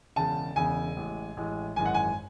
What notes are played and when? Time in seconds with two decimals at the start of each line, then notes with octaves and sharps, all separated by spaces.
0.16 E1 E2 C#3 A5
0.56 E1 E2 C#3 G#5
0.97 A1 A2 G#3
1.37 A1 A2 G#3
1.76 G#1 F#2 E3 G#3 G#5
1.85 F#5
1.94 G#5